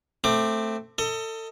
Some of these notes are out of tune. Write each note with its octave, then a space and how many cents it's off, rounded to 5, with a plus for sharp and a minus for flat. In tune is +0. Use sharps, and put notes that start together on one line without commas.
A3 +10 C4 +0 D6 +20
A4 +30 D#5 +20